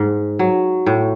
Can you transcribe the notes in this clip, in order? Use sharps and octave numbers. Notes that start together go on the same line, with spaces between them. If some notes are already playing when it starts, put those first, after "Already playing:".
Already playing: G#2
F#3
A2